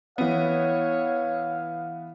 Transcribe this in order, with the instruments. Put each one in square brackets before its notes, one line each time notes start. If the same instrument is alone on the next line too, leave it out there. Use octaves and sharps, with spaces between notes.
[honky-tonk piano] E3 B3 [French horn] C#5 [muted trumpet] F5